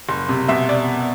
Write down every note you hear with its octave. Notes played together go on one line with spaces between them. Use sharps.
F#1
C3
B2 E5
D5